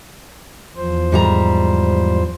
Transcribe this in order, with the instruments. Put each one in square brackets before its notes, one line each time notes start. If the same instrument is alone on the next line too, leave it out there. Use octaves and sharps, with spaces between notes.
[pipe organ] E2 F3 C5
[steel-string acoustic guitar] G#2 G3 A#5